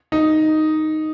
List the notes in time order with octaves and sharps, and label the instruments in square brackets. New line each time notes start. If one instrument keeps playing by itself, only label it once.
[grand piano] D#4